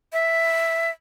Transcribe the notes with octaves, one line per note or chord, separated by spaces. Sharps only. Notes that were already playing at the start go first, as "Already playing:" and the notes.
E5